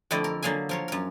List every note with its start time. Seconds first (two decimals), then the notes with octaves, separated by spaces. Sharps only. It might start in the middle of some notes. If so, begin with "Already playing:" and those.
0.11 F2 D3 A3 E4 D5 D#5
0.24 A#4
0.42 D3 F#3 A#3 G#4 G#5
0.69 F3 A#4 C#5
0.88 F#2 A#4